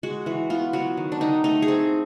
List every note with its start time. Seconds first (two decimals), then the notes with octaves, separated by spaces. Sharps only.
0.03 G#3 F#4
0.26 E3 F#4
0.50 B3 F4
0.73 F#3 F#4
0.97 D#3
1.12 D4
1.21 D#3 D#4
1.44 A3 D#4
1.62 G#4
1.68 C4